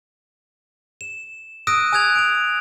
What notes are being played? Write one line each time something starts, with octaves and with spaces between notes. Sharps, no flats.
E7
D#6 E6 F#6 A#6 D7 D#7
G#5 D#6 F#6 G#6 F7
D7 F7